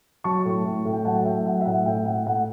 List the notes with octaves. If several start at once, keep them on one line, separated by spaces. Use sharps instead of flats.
F#3 A5 C#6
A2
A2
A2
G5
F#3 F#5 A5
A3 E5 G5
F#3 F#5
E5
A2 F#5
A2 E5 G5
A2 F#5
A2 F#5